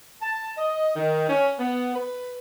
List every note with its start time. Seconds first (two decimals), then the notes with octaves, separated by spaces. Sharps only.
0.21 A5
0.56 D#5
0.96 D#3
1.28 C#4
1.59 B3
1.95 B4